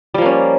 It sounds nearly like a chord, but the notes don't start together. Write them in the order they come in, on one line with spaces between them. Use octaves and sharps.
G3 F3 A#3 C#4